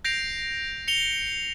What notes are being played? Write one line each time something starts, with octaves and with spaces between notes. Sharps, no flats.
G6 A#6 C7 D7 F7
C#7 F7 G7